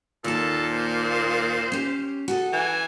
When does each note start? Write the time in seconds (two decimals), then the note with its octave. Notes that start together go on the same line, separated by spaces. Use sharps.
0.24 D#2 A#2 A4 A5
0.72 C5
1.72 C#4 G4
2.28 F#4 G#4 A4
2.53 E3 G#5